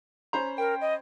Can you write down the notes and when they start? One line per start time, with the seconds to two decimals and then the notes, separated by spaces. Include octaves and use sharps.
0.33 C#4 C5 A#5 B5
0.58 A#4 G5
0.81 D#5